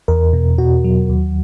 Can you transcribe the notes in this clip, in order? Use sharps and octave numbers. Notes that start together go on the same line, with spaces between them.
E2 A#4
B2
B2 F#4
F#3
D#2